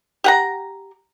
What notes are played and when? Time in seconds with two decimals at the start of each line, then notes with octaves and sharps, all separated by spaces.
0.24 G4 F#5 A#5